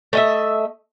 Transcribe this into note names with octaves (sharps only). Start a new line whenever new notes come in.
A3 D#5 E5